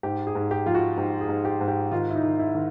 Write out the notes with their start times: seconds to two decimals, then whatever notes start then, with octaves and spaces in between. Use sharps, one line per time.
0.03 G#2 G4
0.27 G#4
0.35 G#2
0.51 G4
0.66 F3 F4
0.75 F#4
0.97 G#2 G4
1.21 G#4
1.29 G#2
1.45 G4
1.61 G#2
1.68 G4
1.92 D#3 F4
2.10 E4
2.15 D#4
2.23 D#3
2.39 E4
2.55 D#3